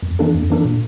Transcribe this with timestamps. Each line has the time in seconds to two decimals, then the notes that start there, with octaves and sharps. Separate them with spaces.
0.03 F2
0.19 E3 A#3 D4 A4
0.35 F2
0.50 E3 A#3 D4 A4
0.65 A#2